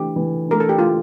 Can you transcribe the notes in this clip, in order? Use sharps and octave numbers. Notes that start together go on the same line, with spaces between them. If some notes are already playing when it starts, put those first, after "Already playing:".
Already playing: E3 A3 D4 G4
E3
A3 D4 A#4
A4
G4
E3 F4